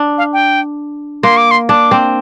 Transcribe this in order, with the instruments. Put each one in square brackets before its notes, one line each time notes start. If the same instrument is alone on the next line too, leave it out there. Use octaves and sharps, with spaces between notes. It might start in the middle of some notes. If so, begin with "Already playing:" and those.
Already playing: [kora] D4
[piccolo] F5
G5
[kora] A#3 [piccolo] C6
[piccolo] D6
C6
[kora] D4 [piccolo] D6
[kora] C4